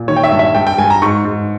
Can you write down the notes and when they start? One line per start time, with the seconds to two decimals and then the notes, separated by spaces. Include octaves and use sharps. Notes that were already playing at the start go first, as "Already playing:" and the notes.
Already playing: A#2
0.08 D#3 C#5
0.16 G5
0.23 E5
0.32 G2
0.39 E5
0.55 G2 G5
0.67 G5
0.78 G2 G#5
0.90 A#5
1.02 G#2 C#6
1.25 G#2